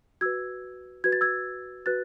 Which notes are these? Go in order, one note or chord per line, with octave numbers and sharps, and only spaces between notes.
F#4 B4 E6 G#6
F#4 B4 G#6
A6
E6 G#6
F#4 B4 F#6 A6